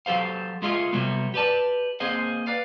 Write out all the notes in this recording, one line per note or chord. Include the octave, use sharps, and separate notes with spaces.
F#3 G4 A4 C5 F5
G#3 A3 F4 G#4 D#5 F5
C3 F#3 G3 A3 B3
G4 B4 D5 A5
A#3 C4 G#4 C5 D#5 F5
B4 D5 F5